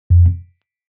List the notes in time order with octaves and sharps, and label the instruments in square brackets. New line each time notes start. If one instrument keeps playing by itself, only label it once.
[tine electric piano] F2